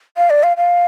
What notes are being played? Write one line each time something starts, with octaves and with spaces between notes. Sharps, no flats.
F5
D5
F5
F5